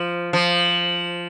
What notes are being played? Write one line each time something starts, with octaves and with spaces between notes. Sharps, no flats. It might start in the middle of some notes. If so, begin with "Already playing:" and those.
Already playing: F3
F3